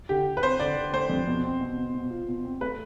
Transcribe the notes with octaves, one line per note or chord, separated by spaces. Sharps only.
D3 G4
D3
B4
C4 C5
D3 D5
D3
A3 C5
F2
B2
C4
B2
B2
B2
F4
B2
C4
A3 B4